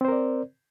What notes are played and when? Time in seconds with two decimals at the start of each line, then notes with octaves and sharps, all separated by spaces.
0.01 C4
0.05 C5
0.08 A#4
0.12 D5